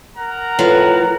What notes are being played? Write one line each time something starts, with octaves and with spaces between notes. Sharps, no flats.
A#4 F#5 A#5
A2 F3 B4